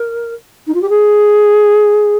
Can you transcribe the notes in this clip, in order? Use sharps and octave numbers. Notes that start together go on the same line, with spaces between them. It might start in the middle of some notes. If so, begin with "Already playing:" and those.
Already playing: A#4
D#4
F4
G4
G#4